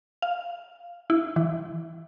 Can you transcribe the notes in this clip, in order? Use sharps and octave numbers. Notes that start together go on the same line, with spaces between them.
F5
E4
E3